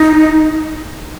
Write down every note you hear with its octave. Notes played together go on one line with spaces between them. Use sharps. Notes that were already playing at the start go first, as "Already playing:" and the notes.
Already playing: D#4